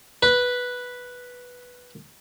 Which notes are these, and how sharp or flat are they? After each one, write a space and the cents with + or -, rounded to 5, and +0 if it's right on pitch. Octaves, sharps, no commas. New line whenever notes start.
B4 -5